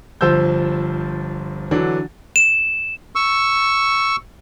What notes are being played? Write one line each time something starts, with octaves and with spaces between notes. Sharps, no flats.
G1 F3 C5 E6 G6
D3 E3 F#3 D4
E7
C#6 E6